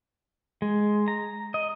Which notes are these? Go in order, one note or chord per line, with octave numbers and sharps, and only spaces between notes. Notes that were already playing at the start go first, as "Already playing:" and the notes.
G#3
A#5
D#5